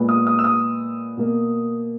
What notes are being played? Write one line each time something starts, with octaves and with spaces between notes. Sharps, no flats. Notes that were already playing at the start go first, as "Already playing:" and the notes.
Already playing: A#2 G#3 B3
D#6
D#6
E6
D#6
B2 A#3